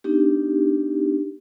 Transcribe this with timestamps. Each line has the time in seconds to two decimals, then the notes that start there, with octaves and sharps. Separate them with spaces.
0.04 B3 D4 D#4 G4